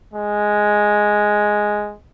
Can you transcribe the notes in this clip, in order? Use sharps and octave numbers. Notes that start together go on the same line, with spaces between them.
G#3